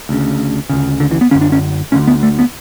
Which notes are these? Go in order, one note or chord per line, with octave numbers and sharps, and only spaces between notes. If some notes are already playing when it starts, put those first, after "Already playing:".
D2 C#3
D2 C#3
D3
E3
B3
F#2 D3 C#4
D4
C#4
D2 D3 C#4
B3
A3
B3